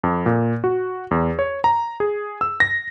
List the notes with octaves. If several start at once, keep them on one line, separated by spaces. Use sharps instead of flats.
F2
A#2
F#4
E2
C#5
A#5
G#4
E6
A#6